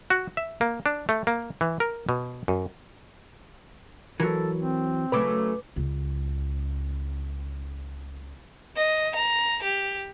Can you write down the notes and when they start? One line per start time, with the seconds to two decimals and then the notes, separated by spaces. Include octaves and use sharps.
0.10 F#4
0.37 E5
0.61 A#3
0.86 D4
1.09 A3
1.27 A#3
1.61 E3
1.80 A#4
2.09 B2
2.48 F#2
4.20 E3 F#3 A4 A#4
4.60 C4
5.12 C#3 F#3 A3 B4 D6
5.76 C#2 C#3
8.76 D#5
9.15 A#5
9.63 G4